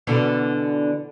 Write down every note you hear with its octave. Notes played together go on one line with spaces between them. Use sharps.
B2 D3 E3